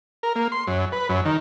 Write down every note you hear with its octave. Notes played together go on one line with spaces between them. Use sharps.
A#4
A#3
C6
F#2
B4
F#2
D#3